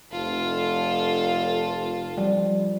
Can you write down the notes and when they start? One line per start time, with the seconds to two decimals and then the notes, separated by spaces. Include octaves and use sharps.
0.12 F1 F4 A4
2.17 F3 G3